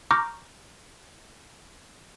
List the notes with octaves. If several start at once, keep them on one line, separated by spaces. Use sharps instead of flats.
A#5 C#6 D6 F6 G6 A#6